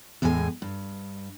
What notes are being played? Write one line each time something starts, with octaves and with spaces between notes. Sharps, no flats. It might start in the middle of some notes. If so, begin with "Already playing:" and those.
E2 A2 G#3 C5 G#5
G2